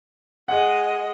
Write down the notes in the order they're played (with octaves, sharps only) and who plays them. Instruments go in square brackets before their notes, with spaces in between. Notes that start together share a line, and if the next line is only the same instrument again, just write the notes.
[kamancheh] G#3 D#5 [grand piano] F#5